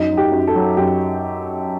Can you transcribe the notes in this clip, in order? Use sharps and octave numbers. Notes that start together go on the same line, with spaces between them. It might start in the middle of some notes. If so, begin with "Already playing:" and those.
Already playing: F#2 D#4
F#3
G4
F#2
A4
F#3
F#2 G4